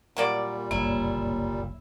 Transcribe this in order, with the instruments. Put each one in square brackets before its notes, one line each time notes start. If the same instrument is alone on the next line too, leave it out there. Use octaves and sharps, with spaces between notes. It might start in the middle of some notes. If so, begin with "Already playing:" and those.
[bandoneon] A#2 G3 [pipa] F#3 A#3 D5
[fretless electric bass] F#1 C2 G2 [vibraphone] A#3 C#5 [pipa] E4